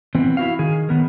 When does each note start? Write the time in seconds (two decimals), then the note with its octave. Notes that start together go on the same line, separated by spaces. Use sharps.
0.15 E3 B3 C4
0.37 E4 F#4 F5
0.59 D#3 G#4
0.89 D#3 B3 A#4